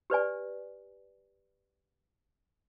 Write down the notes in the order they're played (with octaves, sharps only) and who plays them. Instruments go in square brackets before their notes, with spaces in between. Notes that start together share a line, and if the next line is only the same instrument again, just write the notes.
[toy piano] G4 B4 D5 G#5